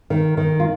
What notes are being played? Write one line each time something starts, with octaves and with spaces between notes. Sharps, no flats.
D#3
D#3
F4